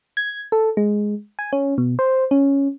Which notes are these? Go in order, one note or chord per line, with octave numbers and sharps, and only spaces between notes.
G#6
A4
G#3
G#5
C#4
B2
C5
C#4